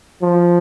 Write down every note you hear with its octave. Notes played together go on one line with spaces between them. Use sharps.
F3